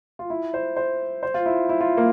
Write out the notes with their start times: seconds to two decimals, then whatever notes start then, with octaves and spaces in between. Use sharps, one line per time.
0.19 F4
0.30 E4
0.54 C5
0.76 C5
1.23 C5
1.34 F4
1.46 E4
1.69 E4
1.81 F4
1.97 A#3